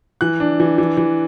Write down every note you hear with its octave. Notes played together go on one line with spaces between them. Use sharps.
E3 F#6
D4
E3
E3
E3